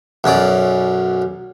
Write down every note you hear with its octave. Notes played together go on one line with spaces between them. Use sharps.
B1 F#2 C#4 D5